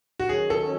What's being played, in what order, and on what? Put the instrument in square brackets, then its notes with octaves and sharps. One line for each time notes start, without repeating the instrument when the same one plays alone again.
[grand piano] F#4
[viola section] D#3 F#3 C#4 [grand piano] G#4
[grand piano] A4